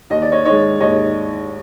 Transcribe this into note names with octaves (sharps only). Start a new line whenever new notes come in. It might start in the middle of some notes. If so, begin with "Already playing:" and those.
D#2 D#5
D5
C#5 D#5
D#3 G#3 C#5 D#5
D#2 C#5 D#5